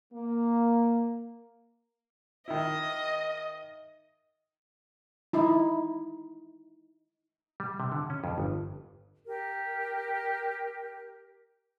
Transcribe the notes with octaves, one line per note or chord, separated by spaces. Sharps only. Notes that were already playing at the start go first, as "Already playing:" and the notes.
A#3
D#3 E4 D#5
D#4 E4
G3
C3
D3
C#4
F2
G1
G4 A#4